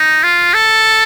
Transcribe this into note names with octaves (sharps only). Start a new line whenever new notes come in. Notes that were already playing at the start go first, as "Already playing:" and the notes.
Already playing: D#4
F4
A4